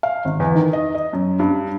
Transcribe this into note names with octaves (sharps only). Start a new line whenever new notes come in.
F5
G#1
E2
D#3
D#5
D#5
F#2
G2